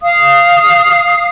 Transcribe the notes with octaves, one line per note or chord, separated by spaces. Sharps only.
F5 D#6